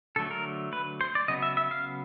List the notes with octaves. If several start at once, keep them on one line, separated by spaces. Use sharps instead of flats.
D3 F#3 A3 A4
A#4
B4
C5
D5
C#3 F#3 B3 D#5
E5
E5
F5